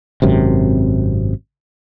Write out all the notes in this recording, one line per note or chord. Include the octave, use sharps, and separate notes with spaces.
G#1 F#2 C3